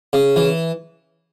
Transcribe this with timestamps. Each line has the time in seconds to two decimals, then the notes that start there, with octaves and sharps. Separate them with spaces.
0.13 C#3
0.36 E3